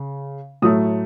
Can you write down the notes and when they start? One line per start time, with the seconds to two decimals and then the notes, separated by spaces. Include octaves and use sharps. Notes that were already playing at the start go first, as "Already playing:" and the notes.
Already playing: C#3
0.62 A2 F#3 A3 D#6